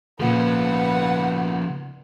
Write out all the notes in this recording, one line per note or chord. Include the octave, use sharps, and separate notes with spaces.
A#2 C#3 F3 B4 F#5